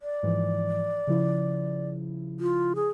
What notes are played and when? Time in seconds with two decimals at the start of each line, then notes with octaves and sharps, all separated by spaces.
0.01 D5
0.23 G#2 E3 F3
1.07 C#3 F3 E4
2.40 F4
2.75 G#4